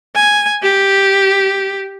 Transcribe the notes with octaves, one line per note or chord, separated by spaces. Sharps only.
G#5
G4